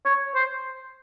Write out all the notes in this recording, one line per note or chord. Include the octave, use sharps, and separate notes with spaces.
C#5
C5